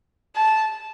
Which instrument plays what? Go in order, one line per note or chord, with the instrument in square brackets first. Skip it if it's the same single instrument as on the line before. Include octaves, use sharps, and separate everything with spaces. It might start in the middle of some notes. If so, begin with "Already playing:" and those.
[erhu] A5